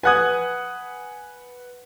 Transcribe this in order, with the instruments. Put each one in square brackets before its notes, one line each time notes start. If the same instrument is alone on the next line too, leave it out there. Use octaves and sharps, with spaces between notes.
[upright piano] B4 F#5 D#6 [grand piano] G#5 F#6 G#6